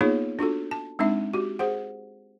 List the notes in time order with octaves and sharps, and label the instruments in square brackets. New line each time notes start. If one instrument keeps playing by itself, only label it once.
[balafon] A#3 B3 D#4 F4 G#4 C#5
D4 F4 F#4 A4
A5
G#3 C4 D4 D#4 E5
F#4 G4
G#4 C5 F#5